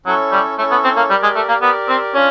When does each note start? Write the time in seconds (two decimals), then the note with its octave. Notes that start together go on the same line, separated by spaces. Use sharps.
0.06 F#3 C#4 E4 A4 C#5
0.32 G3
0.58 A3 C#4 E4 A4 C#5
0.71 B3
0.84 C4
0.96 A#3
1.10 G3 G4 A#4 D5
1.23 G#3
1.36 A3
1.48 A#3
1.61 B3 G4 A#4 D5
1.88 C4
2.14 C#4 D4 F4